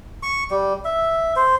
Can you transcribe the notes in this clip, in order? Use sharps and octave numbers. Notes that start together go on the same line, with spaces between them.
C#6
G3
E5
C5